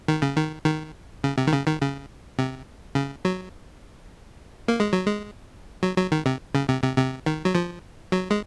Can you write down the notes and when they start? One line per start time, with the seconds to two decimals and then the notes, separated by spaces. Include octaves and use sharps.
0.08 D#3
0.22 C#3
0.36 D#3
0.66 D#3
1.24 C#3
1.38 C3
1.47 D#3
1.53 C#3
1.67 D#3
1.82 C#3
2.39 C3
2.95 C#3
3.25 F#3
4.68 A#3
4.80 G#3
4.93 F#3
5.06 G#3
5.83 F#3
5.97 F#3
6.12 D#3
6.26 C3
6.55 C#3
6.69 C3
6.83 C3
6.98 C3
7.26 D#3
7.45 F#3
7.55 F3
8.12 F#3
8.30 G#3